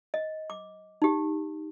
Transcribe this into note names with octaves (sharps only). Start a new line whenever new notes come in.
D#5
D6
D#4 G4